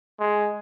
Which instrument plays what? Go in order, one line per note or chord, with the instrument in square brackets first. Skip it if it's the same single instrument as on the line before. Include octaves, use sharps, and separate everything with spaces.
[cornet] G#3